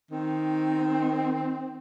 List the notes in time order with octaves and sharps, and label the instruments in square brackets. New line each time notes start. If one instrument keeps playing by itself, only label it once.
[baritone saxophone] D#3 [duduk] C4